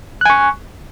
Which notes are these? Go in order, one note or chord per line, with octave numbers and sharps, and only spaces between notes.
G#5 C#6 F#6